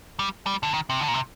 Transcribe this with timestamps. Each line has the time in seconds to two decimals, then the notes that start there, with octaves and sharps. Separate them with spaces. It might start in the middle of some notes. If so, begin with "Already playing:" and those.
0.19 G3
0.46 G3
0.63 D3
0.74 D#3
0.90 C3
1.01 D3
1.08 A#2
1.14 C3